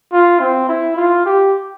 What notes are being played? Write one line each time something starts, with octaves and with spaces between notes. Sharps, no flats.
F4
C4
E4
F4
G4